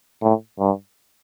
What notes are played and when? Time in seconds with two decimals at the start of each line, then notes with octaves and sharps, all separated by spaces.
0.22 A2
0.59 G2